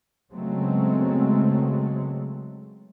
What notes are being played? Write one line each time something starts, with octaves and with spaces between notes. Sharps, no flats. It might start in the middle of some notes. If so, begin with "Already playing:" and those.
C#3 F#3 G#3 A3 B3 C4